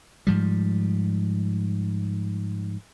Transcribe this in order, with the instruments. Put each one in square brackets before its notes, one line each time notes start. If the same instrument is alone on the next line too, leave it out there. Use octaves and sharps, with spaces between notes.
[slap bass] G#2 F3 G3